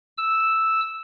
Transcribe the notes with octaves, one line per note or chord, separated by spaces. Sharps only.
E6